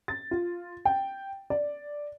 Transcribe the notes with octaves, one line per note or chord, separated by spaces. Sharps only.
A6
F4
G5
D5